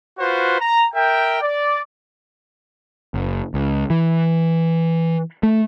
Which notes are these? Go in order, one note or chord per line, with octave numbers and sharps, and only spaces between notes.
F4 F#4 B4 C5
A#5
A#4 E5 G5
D5
F#1
C#2
E3
A3